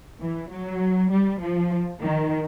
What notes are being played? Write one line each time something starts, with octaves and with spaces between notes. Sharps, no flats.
E3
F#3
G3
F3
D#3